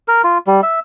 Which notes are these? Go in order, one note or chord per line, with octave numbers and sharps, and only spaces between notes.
A#4
F4
G3
E5